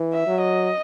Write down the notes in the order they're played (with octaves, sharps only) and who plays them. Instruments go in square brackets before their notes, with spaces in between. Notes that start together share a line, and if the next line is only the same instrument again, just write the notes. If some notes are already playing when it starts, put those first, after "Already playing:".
Already playing: [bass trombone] E3
[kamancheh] E5
[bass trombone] F#3
[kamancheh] D#5